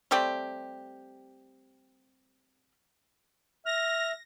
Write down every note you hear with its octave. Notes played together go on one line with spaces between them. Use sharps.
G3 A3 C4 G4
E5 F6 A#6